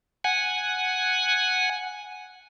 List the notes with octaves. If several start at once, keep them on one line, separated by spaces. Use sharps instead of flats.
F#5 G#5